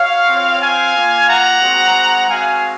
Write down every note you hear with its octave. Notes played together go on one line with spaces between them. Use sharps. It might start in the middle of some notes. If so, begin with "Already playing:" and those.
Already playing: F#4 C#5 F5
C4 F4
F5 G#5
A#3 F4
F#5 A#5
G#3 C4 F#4
G#3 C4 F#4 F5 G#5